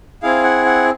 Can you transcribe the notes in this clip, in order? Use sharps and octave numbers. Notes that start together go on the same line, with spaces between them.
C4 E4 G#4 F5
F#5
F#5